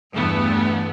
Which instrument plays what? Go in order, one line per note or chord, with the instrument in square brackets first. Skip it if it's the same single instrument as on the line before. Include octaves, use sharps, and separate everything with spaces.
[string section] E2 G2 A3 B3